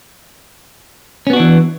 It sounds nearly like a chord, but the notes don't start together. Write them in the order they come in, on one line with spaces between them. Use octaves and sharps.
C#4 B3 F#4 D4 E3